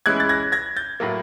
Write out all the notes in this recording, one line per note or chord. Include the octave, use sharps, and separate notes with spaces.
E3 G#3 C#4 E4 F#6 G#6
A6
G#6 A#6
G#6 A#6
G6 A6
A2 F#3 A#3